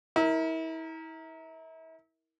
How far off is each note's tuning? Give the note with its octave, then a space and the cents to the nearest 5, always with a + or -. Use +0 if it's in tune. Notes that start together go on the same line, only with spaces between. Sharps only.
E4 -35 A#4 +0